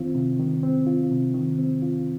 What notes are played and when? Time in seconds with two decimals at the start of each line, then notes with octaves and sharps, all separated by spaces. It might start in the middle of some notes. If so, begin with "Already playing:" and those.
Already playing: D#3 C4 F4
0.15 C3
0.40 D#3
0.63 C4
0.87 F4
1.11 C3
1.34 D#3
1.59 C4
1.82 F4